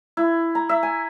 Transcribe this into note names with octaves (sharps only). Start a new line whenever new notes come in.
E4
A#5
E5
G#5